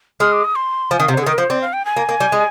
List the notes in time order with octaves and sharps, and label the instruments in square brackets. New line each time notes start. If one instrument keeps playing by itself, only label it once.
[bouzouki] G#3 [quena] F6
[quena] D6
D#6
C6
[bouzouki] F3 [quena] G#5
[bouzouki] D#3 [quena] F5
[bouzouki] C3
[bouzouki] D3 [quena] C5
[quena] G#4
[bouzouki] D#3 [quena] A#4
[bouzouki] F3 [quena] C5
[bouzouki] C4 [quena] D5
[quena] F5
G5
G#5
[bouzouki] A#3
A#3
G3
G#3